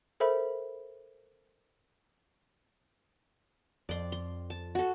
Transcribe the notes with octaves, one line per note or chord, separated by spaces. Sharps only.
A4 A#4 C5 E5 B5
F2 D5 C6
C6
A5
F#4 A4